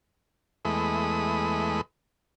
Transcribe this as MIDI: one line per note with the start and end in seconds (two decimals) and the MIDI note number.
0.65 1.81 40
0.65 1.81 56
0.65 1.81 57
0.65 1.81 75
0.65 1.81 83